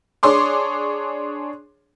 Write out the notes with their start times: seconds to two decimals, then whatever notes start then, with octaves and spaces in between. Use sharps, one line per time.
0.23 D4 G#4 C#5 C6 D6